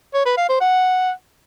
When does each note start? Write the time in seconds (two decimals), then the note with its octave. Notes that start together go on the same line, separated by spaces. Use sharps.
0.14 C#5
0.25 B4
0.37 F5
0.49 C5
0.61 F#5